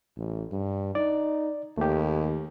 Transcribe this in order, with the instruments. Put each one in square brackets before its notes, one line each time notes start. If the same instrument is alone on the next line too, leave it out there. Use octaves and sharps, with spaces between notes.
[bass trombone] A1
G2
[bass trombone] D#4 [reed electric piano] D5
[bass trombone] D#2 [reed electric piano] A3 G4